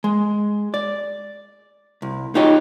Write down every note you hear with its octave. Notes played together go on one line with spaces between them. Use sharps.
G#3
D5
C2
D#4 F4 G4 C#5 D#5